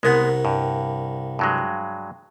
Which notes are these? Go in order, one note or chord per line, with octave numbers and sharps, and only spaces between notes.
C2 G#3 B3 A#4 F#5
G2
G2 F#3 G#3